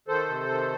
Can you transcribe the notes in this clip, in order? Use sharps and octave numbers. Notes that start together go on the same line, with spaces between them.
D#3 A4 C5
C3
D#3